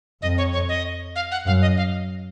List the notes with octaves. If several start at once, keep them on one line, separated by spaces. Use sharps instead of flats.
F2 D#5
C#5
C#5
D#5
F5
F#5
F#2 F5
D#5
F5